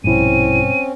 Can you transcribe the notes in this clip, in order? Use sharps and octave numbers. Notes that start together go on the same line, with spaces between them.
A#1 G2 B2 G3 C4 C#4 E4 D#7